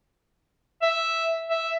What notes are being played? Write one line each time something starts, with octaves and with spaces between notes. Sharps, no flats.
E5
E5